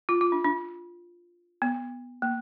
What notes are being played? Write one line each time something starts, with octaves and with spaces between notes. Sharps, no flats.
F4
F4
D4
D4
B3
A#3